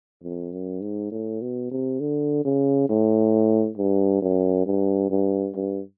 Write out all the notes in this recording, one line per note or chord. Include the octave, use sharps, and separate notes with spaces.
F2
F#2
G#2
A2
B2
C3
D3
C#3
A2
G2
F#2
G2
G2
G2